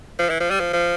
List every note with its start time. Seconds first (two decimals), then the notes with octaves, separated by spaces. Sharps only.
0.19 F3
0.30 E3
0.41 F3
0.51 G3
0.60 F3
0.73 F3